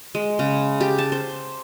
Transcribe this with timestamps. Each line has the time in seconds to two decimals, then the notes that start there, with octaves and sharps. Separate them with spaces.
0.15 G#3
0.39 C#3
0.81 G4
0.98 A5
1.12 C5